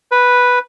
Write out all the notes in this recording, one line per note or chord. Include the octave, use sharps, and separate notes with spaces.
B4